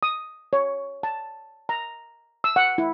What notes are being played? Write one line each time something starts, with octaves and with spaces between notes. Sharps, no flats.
D#6
C#5
A5
A#5
E6
F#5
E4